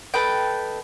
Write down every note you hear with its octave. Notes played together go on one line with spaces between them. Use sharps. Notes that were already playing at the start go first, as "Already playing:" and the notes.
A4 B4 D#5 G5